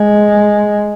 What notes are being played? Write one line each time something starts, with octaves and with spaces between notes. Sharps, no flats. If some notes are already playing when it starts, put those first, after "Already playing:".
Already playing: G#3